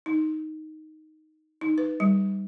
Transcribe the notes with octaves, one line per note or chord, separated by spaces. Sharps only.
D#4
D#4
B4
G3